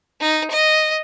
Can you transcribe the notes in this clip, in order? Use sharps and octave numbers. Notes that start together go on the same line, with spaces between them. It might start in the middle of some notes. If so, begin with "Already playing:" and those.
D#4
D#5